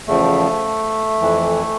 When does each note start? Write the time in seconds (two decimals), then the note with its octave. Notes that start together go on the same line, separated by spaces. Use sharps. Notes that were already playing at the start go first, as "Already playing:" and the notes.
0.07 E2 C#3 F3 A3
1.21 F2 E3